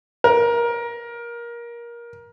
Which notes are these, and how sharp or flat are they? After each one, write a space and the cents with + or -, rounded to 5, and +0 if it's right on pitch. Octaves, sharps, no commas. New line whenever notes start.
A#4 +20